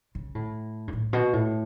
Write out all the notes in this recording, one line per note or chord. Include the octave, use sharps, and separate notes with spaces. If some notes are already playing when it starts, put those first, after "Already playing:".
C#3
A2
G2
A2
B2
A2